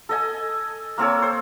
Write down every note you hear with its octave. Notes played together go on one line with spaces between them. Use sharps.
A4 D#5 G#5
A#3 C4 A4 C#5
C5